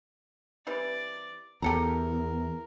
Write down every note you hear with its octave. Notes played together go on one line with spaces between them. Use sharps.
E3 G3 C4 D5
E2 G4 A4 A#4 A#5